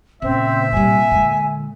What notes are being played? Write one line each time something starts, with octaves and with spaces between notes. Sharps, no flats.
A#2 C#3 C4 E5
C3 G3 G#5
D3 G#3